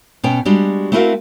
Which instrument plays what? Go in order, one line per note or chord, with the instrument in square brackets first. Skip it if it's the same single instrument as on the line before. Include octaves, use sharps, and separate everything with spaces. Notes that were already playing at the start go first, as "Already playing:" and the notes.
[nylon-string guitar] B2 C#4 G5
G3 G#3 D4 F#4 G4
A3 C4 E4 F#4 A#4 F5